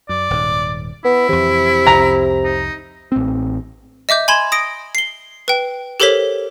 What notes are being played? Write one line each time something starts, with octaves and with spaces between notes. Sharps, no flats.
F#2 D5
D#1 G#2
B3 E4
F2 C3 E3
C2 F2 A#5
D#4
A1 C4
D#5 E5 D6 G6
G#5 B5 C6 G#6 E7
D#6 A#6 D7
C7 G7
B4 G5
G4 A4 A#4 C5 C#5 B6